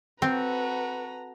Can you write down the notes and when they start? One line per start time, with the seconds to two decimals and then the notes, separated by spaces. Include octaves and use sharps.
0.22 C4 F#4 A4 B4 A#5